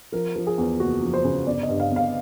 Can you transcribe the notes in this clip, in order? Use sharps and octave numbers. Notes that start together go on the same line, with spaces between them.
F3 A#4
F3
G#4
E2
F#1 F#4
F3
C5
C#3
G1 D5
D#5
G2
F5
G1
F5